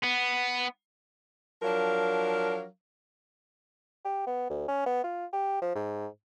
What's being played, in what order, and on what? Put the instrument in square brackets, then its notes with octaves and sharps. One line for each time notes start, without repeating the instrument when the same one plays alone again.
[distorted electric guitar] B3
[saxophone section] F3 F#3 D4 A#4 F5
[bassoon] G4
B3
D2
C#4
B3
F4
G4
F3
G#2